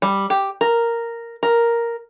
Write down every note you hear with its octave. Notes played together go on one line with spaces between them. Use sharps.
G3
G4
A#4
A#4